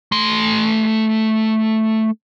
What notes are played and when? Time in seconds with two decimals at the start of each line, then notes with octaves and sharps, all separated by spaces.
0.12 A3 C6